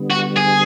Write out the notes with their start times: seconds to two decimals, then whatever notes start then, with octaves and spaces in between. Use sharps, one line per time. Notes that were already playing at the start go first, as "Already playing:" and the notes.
Already playing: D3 G3 B3
0.10 F#4
0.37 G#4